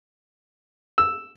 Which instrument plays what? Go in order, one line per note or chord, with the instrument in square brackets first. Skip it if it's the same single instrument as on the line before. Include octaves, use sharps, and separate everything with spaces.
[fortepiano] E6